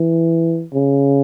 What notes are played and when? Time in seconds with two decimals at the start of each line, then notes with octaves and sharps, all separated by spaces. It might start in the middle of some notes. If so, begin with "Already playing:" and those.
Already playing: E3
0.73 C#3